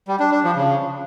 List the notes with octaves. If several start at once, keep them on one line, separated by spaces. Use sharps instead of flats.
G3
D4
D4
F3
C#3